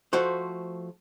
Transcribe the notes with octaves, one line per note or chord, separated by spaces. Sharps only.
F3 A3 F#4 C5